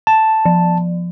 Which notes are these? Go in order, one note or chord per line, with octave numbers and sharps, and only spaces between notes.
A5
F3